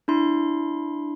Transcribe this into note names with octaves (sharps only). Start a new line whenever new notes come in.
D4 E4 C6